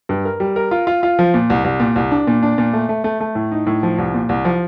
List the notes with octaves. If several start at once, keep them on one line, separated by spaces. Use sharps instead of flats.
G2
A#4
G3
A#4
F4
F4
F4
F3
A#2
C2
C2
A#2
C2
D4
A#2
D4
A#2
A3
A3
A3
A3
A2
D#4
A2
F3
C2
A#2
C2
F3